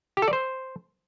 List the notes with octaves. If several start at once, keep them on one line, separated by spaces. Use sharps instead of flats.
G4
A4
D5
C5